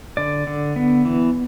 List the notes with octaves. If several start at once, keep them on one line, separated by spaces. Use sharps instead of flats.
D3 D5
D3
B3
E3